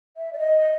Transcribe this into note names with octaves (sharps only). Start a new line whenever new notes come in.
E5
D5
D#5